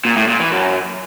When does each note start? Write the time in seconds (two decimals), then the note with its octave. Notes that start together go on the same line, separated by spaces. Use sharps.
0.05 A#2
0.17 A2
0.28 A#2
0.40 E3
0.51 F#2